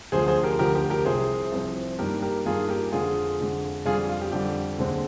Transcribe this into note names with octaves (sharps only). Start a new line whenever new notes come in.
D2 D3 F3 G#4 C5
G#4 C5
G4 A#4
D2 D3 F3 G4 A#4
G4
G4 A#4
C2 C3 F3 C4 G#4 C5
C2 C3 F3 C4
G2 D#3 A#3 G4 A#4
G4 A#4
G2 D#3 A#3 F4 G#4
G4 A#4
F2 D3 G#3 F4 G#4
F2 D3 G#3
F2 D3 G3 F4 G#4
F4
G4
F2 D3 G3 G4
D#2 D3 G#3 C4